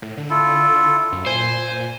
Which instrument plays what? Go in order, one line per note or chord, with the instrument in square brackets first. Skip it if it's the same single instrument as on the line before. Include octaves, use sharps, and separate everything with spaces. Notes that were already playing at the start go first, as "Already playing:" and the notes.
[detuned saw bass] A2
D3
[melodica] E4 F4 A4
[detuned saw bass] F#2
[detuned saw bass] A#2 [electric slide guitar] C5 [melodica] G#5